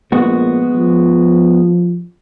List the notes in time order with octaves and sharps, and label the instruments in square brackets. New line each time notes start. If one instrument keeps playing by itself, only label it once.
[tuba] A#1 [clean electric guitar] G#3 B3 F#4
[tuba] F3